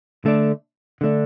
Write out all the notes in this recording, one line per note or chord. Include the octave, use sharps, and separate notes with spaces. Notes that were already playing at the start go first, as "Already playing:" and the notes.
D3 A3 D4
D3 A3 D4